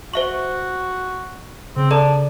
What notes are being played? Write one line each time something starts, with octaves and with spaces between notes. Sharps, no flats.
F#4 C5 E5 C#6
C#3 C4
D4 A4 D5 A#5